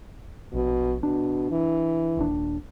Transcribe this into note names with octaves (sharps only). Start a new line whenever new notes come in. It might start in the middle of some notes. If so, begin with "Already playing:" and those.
A#1 B2
B2 D4
E3
D#1 D#2 D4